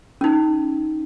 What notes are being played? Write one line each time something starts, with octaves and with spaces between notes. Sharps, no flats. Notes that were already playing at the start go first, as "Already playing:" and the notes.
C#4 D#4